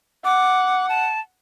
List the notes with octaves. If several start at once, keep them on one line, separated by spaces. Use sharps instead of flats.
F#5 D6
A5